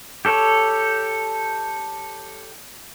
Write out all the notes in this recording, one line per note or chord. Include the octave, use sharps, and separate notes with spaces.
G4 A4 C#5